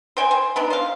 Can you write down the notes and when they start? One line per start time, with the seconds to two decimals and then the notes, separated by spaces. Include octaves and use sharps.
0.17 C5 G5 G#5
0.31 C5
0.56 B3 D4 D#4
0.70 C5 F5